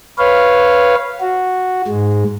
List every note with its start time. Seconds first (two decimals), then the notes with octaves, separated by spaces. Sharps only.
0.19 B4 C#5 F5
1.21 F#4
1.88 G#2 G#3